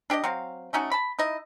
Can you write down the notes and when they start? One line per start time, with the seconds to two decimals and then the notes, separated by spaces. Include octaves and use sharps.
0.10 D4 G4 D5 D#5
0.24 F#3 C4 F5
0.73 A3 C#4 D#4 F#4
0.91 A5 B5
1.19 D#4 E4 D#5